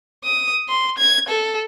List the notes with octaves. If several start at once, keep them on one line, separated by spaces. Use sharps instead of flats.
D#6
C6
G#6
A4